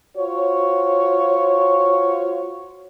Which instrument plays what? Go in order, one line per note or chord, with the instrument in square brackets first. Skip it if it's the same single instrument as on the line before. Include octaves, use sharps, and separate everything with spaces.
[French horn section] F4 F#4 C5 C#5